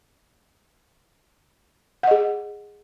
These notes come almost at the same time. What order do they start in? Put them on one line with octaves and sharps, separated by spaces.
F#5 D#5 G#4